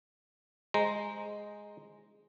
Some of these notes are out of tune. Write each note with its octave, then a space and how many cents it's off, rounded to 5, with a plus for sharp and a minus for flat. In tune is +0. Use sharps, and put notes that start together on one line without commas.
G#3 +0 C5 +0 A#5 +0